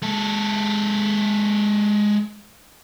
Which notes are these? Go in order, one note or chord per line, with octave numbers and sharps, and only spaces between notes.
G#3 A4